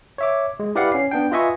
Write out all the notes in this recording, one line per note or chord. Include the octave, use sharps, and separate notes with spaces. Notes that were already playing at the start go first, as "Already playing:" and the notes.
C#5 E5 D6
G#3
E4 G4 B4 D5 F5 F#5
C#4 C7
B3 D4 G5
F4 B4 D#5 E5 G#5 C#6